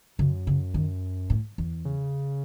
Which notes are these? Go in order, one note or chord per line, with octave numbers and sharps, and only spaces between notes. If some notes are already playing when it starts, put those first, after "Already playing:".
F#2 C#3
C#3
D#3
A2
E2
C#3